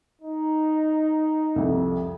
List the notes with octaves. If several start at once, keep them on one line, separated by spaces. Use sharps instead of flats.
D#4
C2 F2